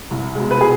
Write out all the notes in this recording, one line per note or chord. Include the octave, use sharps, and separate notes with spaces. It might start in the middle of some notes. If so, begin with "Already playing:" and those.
C2
B2 G#3
B4
G#4